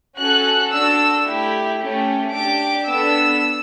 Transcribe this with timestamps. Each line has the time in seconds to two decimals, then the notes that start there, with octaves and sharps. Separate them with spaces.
0.18 C#4 F#4 A4 F#6
0.72 D4 F#4 A4 E6
1.26 A3 E4 G4
1.80 A3 C#4 G4
2.34 D4 G4 D6
2.88 B3 D4 A4 E6